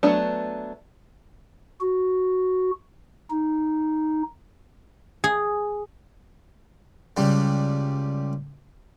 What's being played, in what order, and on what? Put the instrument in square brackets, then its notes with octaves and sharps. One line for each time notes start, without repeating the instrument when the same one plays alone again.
[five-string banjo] F#3 A3 B3 D4
[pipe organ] F#4
D#4
[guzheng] G#4
[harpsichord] C#2 G3